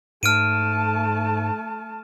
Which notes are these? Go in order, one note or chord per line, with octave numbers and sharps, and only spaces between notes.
G#2 A3 A5 F6 D7 D#7